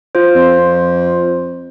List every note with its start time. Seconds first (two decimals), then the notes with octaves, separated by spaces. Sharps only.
0.15 F4 C5
0.35 F2